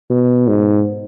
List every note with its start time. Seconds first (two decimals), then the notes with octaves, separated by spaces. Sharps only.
0.10 B2
0.48 G#2